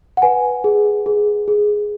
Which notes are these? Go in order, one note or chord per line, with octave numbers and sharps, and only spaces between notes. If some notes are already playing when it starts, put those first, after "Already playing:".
F#5
B4 G#5
G#4
G#4
G#4